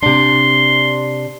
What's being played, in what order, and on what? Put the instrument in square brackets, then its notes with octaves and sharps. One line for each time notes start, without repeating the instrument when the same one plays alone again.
[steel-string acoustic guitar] C3 D4 [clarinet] C6